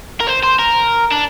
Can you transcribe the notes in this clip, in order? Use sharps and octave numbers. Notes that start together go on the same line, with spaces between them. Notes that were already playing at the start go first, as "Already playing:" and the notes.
A#4
C5
C5
A#4
D4